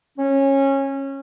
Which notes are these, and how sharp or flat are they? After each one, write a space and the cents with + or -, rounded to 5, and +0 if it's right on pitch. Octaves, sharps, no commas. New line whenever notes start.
C#4 -20